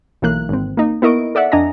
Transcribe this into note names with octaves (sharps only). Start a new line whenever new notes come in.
B1 E3 A#3 F#6
G#1 C4
A#3 D#4
B3 E4 A#4 D#5 C#6 D7
A4 D5 E5 F#5
F2 D4 D#5 G#5 A#5 A#6